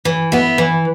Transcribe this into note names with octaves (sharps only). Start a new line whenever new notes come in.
E3
B3 E4
E3